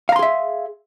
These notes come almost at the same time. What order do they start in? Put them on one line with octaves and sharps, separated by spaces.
F5 A#5 C6 G#4 E5